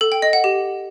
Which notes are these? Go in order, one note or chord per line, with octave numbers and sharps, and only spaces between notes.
A4
G5
D#5
F#5
G4